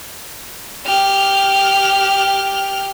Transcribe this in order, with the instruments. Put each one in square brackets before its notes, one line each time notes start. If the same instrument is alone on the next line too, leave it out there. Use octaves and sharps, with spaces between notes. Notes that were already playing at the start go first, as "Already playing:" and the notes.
[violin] G4 F6